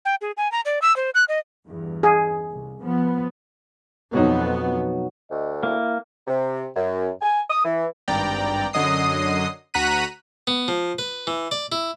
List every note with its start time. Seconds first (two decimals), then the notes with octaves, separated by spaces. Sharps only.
0.05 G5
0.21 G#4
0.37 G#5
0.52 A#5
0.65 D5
0.82 E6
0.96 C5
1.15 F#6
1.28 D#5
1.66 E2 G2
2.03 G#4
2.52 C2
2.81 F3 B3
4.13 F2 B2 F#3 B3 D#4
5.31 D2 D#5
5.63 A#3 E4
6.27 C3
6.76 F#2
7.22 G#5
7.50 D#6
7.64 E3
8.08 G#1 G2 D5 G5 A#5
8.73 F#2 D3 F#3 D#5 D#6 C7
9.74 D2 F#4 A#5 F#6 B6 D#7
10.47 B3
10.68 F3
10.98 B4
11.27 E3
11.51 D5
11.72 E4